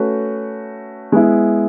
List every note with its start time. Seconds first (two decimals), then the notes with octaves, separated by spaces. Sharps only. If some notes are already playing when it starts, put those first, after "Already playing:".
Already playing: A3 C#4 F#4 B4
1.12 G#3 B3 E4